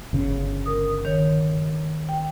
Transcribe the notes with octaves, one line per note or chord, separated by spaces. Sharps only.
G1 C#3
A#4 D#6
D#3 C#5
G5